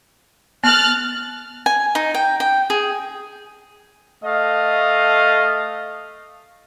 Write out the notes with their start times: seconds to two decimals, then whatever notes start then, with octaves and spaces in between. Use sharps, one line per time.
0.64 B3 F6 F#6 A6
1.66 G#5
1.95 D#4
2.15 G5
2.40 G5
2.70 G#4
4.23 A3 D#5 F5